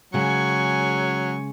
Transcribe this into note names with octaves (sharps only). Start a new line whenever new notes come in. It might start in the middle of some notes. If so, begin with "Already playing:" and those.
C#3 F#3 G#3 G#5 C#6